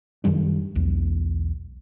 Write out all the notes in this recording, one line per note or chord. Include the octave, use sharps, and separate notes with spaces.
F#2 D#3 G3 D4
B1 E2